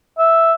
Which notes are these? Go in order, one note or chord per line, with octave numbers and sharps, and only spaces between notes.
E5